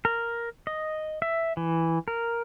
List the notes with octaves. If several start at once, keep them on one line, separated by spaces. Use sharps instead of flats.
A#4
D#5
E5
E3
A#4